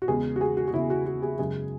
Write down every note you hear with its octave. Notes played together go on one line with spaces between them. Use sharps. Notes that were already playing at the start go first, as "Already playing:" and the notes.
F#4
E2 C#3 G#3 G#4
F#4
G#4
F#4
F#4
E2 C#3 G#3 E4
F#4
F#4
G#4
F#2 C#3 G#3 G#4